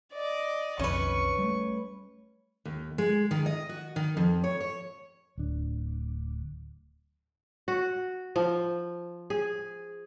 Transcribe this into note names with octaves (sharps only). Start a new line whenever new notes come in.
D5 D#5
B1 F2 D#3 C#4 B4 C#6
G3 A3
D#2
G#3
D#3
D#5
F#4
D#3
F2
C#5
C#5
D1 D4
F#4
F3
G#4